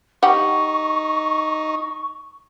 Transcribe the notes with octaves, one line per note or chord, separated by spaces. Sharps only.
G3 D#4 G4 F#5 C#6